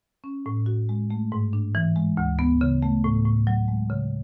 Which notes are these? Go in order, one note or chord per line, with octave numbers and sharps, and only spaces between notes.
C#4
A2
F#4
G#3
A3
G#2
D4
E3
G#3
D2
B3
C#3
A3
A2
A2
F#3
G#3
C#3